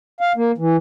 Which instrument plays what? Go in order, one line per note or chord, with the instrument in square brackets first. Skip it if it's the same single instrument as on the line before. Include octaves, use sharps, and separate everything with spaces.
[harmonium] F5
A#3
E3